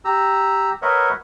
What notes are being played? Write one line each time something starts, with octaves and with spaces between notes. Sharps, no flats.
G4 A#5 E6
A#4 B4 C#5 D#5 E5 F#5